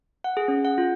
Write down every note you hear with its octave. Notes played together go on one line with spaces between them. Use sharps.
F#5
G#4
C#4
F#5
F4